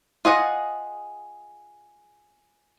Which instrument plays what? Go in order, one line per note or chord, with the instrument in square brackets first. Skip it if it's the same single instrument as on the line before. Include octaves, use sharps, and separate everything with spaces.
[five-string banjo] F4 G#4 D#5 F#5